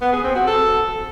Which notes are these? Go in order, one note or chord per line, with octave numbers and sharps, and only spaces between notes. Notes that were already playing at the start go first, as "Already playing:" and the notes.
B3
G#4
C4
F#4
A4